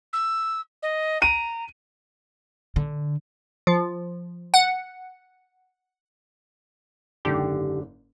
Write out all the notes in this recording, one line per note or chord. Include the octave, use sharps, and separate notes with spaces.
E6
D#5
A#5 D7 D#7
D3
F3
F#5
F#1 G#2 D3 G4